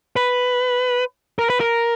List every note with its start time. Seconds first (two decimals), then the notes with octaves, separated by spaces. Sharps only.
0.16 B4
1.39 A#4
1.50 B4
1.60 A#4